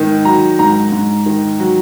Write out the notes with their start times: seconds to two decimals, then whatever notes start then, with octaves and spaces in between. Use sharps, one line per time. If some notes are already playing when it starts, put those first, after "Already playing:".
Already playing: G#2 D#3
0.25 F#3 A#5
0.59 G#2 A#5
0.92 G#2
1.26 D#3
1.60 F#3